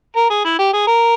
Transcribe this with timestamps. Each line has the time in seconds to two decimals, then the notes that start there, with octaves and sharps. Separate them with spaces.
0.16 A#4
0.30 G#4
0.44 E4
0.59 G4
0.73 G#4
0.87 A#4